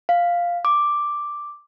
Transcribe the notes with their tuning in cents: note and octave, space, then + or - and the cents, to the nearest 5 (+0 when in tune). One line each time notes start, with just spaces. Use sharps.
F5 +0
D6 +0